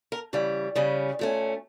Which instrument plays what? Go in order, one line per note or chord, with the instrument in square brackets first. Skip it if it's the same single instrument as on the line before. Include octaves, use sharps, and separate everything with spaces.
[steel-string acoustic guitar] A#4
C#3 E3 G3
C#3 G3 C#4
A#2 A3 C#4